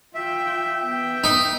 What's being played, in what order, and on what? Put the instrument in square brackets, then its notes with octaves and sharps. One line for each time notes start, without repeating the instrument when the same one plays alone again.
[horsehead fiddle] F4 G5 [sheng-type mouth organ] E5
[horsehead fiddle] B3 G5
[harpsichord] D#4